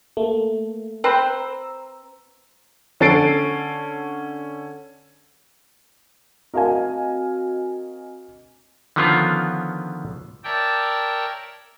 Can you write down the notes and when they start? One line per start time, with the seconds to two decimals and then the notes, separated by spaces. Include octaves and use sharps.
0.17 A3 A#3
1.04 C4 B4 C5 A#5 E6
3.00 D3 C#4 A4 A6 C7 D7
6.54 C4 F#4 A#4 D#5 F5 G#5
8.96 D3 D#3 F3 B3 C#4 F4
10.44 A#4 C#5 D5 E5 G5 A5